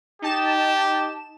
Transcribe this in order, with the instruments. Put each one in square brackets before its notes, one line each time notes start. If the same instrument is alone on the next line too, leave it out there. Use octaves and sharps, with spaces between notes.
[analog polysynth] D#4 A5 E7 [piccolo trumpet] G4